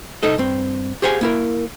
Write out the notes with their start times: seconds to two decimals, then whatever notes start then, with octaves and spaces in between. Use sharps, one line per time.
0.23 C2 D#4 A4 D#5
0.38 G2 C4
1.02 G4 G#4 C5 F5 F#5 G#5
1.21 A#3 E4 A#4